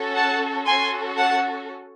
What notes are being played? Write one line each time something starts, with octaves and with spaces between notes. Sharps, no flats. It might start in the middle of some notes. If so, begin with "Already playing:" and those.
Already playing: C#4 F#4 A4
F#5 A5
C#4 F#4 A4 G#5 C6
F#5 A5